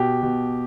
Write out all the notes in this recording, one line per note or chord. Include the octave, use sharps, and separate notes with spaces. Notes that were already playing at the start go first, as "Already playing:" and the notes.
Already playing: B2 G4
B2